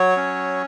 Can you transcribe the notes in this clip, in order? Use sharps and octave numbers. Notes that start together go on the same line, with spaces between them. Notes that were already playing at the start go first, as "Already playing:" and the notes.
Already playing: F#3 C#5
C#4